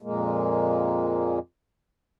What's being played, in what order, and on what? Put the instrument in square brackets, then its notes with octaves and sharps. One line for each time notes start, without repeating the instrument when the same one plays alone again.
[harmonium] F2 A#2 G#3 A#3